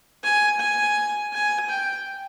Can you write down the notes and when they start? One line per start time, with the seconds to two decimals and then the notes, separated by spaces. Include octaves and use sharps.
0.23 G#5
0.60 G#5
1.33 G#5
1.69 G5